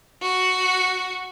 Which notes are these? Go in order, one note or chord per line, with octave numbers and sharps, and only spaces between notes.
F#4